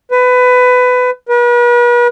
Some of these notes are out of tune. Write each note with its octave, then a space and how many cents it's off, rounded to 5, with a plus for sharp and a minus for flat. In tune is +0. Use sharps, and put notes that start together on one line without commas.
B4 +20
B4 -40